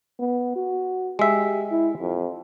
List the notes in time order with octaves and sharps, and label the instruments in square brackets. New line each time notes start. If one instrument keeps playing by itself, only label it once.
[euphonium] B3
F#4
[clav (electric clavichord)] G#3 E5 [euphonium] G4
[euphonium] E4
F2